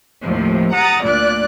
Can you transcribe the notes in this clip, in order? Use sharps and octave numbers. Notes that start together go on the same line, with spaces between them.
D#2 A2 C3 F3
F#5 A#5 D#6 A6
D2 A#2 D5 F#6